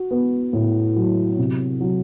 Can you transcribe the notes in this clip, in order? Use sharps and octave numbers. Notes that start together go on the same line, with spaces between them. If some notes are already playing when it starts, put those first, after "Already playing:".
Already playing: F#4
B3
A2
F#3
C3
F#3